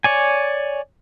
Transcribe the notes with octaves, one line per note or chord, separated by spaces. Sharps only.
C#5 D5 G#5